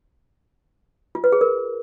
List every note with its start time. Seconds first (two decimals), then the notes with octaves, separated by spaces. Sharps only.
1.15 F4
1.24 B4
1.32 G#4
1.41 A#4